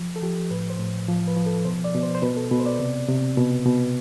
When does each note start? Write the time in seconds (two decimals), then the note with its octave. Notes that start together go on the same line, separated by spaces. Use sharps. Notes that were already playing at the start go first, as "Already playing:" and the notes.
Already playing: F3
0.16 A4
0.22 F3 G4
0.51 A2 B4
0.70 C5
0.79 A2
1.09 F3
1.28 B4
1.37 F3
1.46 A4
1.65 B2 C5
1.84 D5
1.95 B2
2.03 C5
2.15 C5
2.22 B2 B4
2.37 A4
2.51 B2 B4
2.60 C5
2.66 D5
2.79 C3
3.08 C3
3.37 B2
3.66 B2